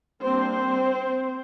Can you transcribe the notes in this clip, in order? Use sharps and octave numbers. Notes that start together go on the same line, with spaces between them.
G3 A#3 C4 D4 C5